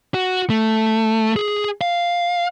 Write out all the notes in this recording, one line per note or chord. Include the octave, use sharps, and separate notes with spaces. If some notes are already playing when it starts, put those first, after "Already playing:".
F#4
A3
G#4
F5